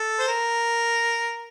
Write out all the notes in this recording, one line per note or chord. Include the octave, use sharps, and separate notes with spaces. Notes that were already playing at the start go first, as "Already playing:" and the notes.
Already playing: A4
C5
A#4